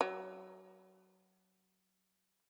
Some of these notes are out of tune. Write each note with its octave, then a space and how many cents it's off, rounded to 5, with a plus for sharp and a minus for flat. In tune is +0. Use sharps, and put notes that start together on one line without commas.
F#3 +20